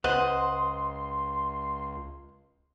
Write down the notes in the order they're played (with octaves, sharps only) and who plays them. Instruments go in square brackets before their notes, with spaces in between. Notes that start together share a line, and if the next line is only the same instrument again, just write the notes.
[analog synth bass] C#2 [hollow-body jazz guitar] B4 C5 [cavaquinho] D#5 F#5 [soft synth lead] C6